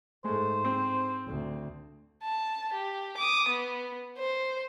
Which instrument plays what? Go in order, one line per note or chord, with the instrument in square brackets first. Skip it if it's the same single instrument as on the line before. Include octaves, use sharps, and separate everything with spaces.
[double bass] G#2 [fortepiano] G#3 A3 [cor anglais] C5
[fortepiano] C4
[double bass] D2
[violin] A5
G4
D6 D#6
B3
C5